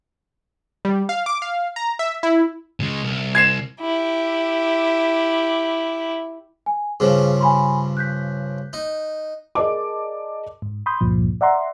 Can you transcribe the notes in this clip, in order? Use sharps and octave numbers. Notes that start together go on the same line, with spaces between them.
G3
F5
D6
F5
A#5
E5
E4
C#3 G#3
C2
G#6 C7 E7
E4 G4
G#5
G2 C#3 F3 G#4 C5
G#5 B5 C6
F#6 G6 B6
D#4
G#4 A#4 D5 D#5 A5 D6
G#2
B5 C6 D#6 G6
C#2 G2 A#2 F3
D5 E5 F#5 A#5 C6